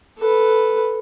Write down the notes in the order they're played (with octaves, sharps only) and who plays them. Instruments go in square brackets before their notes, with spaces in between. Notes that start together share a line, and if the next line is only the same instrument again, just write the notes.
[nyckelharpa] A4 B4